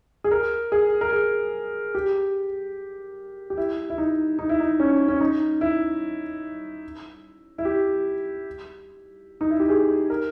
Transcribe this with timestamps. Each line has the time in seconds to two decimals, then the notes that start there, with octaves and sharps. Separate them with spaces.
0.24 G#4
0.31 A#4
0.72 G#4
1.01 A#4
1.12 G#4
1.95 G4
3.50 G4
3.57 E4
3.90 E4
3.98 D#4
4.39 D#4
4.49 E4
4.60 D#4
4.80 C#4
5.08 C#4
5.21 D#4
5.61 E4
7.58 E4
7.65 G4
9.41 D#4
9.50 E4
9.60 G4
9.69 G#4
10.10 A#4